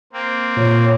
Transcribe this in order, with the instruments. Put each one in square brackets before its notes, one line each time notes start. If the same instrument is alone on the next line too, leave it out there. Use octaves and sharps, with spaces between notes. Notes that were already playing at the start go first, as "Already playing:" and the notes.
[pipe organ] A#3 C4
[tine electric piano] A#2 [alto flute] C#5